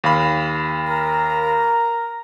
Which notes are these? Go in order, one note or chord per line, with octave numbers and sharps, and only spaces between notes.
D#2 F5 B5
A#4 A#5